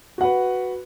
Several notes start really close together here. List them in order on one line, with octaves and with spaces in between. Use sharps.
F#4 F#5 B4